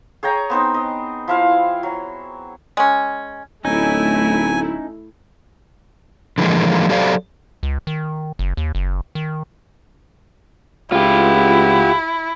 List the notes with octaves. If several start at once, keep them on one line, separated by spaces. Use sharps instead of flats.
G#4 C#5 G5 A#5
B3 C4 D#4
D#5
F3 E4 F5
F#3
G#3 C#4
D1 A3 C#4 D#4 E4 G#5
D3 E3 F3 G#3 A#3
F#3 G4 A4 C5 D5 F5
C#2
D#3
F#1
D#2
F#1
D#3
C#2 E4 F4 G4